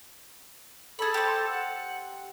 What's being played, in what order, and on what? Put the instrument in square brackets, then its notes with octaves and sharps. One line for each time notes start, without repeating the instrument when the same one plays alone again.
[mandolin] G#4 B5 [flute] A4
[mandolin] C4 G4
[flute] F#5